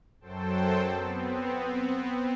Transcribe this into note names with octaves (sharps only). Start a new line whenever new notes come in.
F#2 F#3 A4 C5 G5 A5
B3 C4